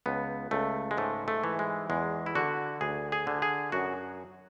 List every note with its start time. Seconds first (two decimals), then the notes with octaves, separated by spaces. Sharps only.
0.06 C#2 B3
0.51 C#2 A3
0.91 G#3
0.97 G#2 A3
1.28 A3
1.44 E3
1.59 G#3
1.90 E2 G#3
2.26 E4
2.35 D3 F#4
2.81 D2 G#4
3.12 G#4
3.27 D3
3.42 G#4
3.72 F#2 F#4